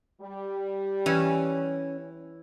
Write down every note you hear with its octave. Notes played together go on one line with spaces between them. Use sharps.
G3
E3 C#4